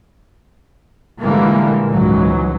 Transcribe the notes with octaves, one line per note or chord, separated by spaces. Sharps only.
A#2 D3 E3 G3 G#3 A#3
C#2 G#2 E3 F#3